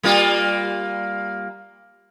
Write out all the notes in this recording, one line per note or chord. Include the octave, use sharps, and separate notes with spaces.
G3 A#3 F4